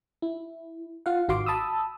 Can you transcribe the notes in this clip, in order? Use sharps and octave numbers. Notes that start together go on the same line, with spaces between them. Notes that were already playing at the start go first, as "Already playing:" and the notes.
E4
F4 F5 F#5
G#1 D#3 F#4 F5 C6 D6
A5 B5 D#6 E6